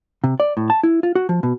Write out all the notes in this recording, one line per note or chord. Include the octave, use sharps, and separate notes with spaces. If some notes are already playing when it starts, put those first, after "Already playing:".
C3
D5
A2
A5
E4
F4
F#4
F3
B2